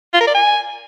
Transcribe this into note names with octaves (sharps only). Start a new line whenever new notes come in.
F4
A#4
D5
G#5